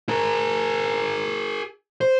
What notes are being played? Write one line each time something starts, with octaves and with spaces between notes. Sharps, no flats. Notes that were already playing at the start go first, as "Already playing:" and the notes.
G#4 A#4
C5